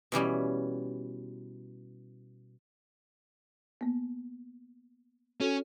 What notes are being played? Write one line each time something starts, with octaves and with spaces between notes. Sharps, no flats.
B2 E3 G3 C#4
A#3 B3
C#4 F#4 A4